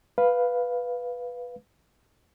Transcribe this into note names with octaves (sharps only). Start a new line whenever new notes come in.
B4 F5